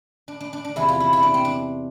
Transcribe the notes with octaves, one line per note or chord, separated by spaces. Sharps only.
D4
D4
D4
D4
E2 C3 E3 E4
F4
E4
E4
D4
C4
D4